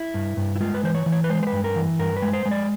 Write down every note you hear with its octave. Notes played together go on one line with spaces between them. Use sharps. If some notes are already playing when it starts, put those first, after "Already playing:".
Already playing: E4
G2
G2
E4
G#3 F4
B4
E3 C5
C#5
E3
C#5
B4
G#3 C5
C5
B4
G2
A#4
E3
G2 A#4
B4
G#3
C5
G#3
D5